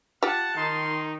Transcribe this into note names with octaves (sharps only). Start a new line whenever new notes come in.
F4 G4 F#5 A5
D#3 D#4 C6